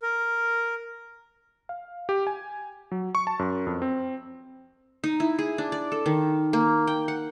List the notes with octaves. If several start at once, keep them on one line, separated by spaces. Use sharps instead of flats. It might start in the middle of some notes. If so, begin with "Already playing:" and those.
A#4
F5
G4
G#5
F#3
C#6
A5
F#2
F2
C4
D#4
E4
G#4
D4
D5
A4
D#3
A#3
G5
F#5